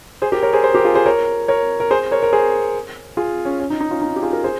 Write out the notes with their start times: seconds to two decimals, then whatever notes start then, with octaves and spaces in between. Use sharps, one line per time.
0.22 G#4 C5
0.32 G4 A#4
0.42 A#4 C#5
0.53 G#4 C5
0.64 G#4 C5
0.75 G4 A#4
0.85 F4 G#4
0.95 G#4 C5
1.06 A#4 C#5
1.48 A#4 C#5
1.80 A#4
1.91 G#4 C5
2.11 A#4 C#5
2.23 A#4
2.33 G#4 C5
3.17 F4 G#4
3.45 C#4
3.60 C#4
3.70 D#4
3.81 D#4
3.91 C#4 F4
4.02 D#4
4.16 G4
4.22 F4 G#4
4.33 G4 A#4
4.44 G#4 C5